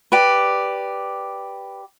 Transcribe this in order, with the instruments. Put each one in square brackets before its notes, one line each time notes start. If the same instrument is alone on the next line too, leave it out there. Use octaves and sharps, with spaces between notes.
[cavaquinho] G4 B4 D5